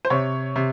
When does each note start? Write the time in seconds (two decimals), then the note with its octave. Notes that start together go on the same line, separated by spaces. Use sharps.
0.05 C5
0.10 C3 C#5
0.56 C3